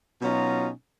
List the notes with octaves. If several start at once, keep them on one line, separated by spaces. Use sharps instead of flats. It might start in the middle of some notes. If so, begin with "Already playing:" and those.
B2 F#3 C#4 D#4 F4 A#5